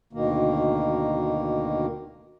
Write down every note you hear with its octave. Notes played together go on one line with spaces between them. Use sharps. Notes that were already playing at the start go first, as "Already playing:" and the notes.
D2 B2 D#3 A#3